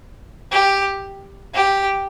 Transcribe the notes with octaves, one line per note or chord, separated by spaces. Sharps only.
G4
G4